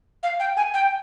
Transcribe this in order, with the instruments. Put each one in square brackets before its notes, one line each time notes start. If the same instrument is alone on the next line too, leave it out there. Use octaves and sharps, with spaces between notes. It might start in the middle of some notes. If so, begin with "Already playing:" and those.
[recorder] F5
G5
G#5
G5